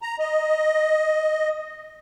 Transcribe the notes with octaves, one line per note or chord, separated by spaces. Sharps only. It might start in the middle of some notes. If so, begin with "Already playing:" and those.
A#5
D#5